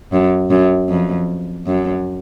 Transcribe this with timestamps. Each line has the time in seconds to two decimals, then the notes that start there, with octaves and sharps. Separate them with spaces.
0.13 F#2
0.50 F#2
0.89 F2
1.67 F#2